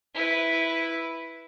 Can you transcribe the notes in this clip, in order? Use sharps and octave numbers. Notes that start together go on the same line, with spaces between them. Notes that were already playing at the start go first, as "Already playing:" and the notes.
E4 B4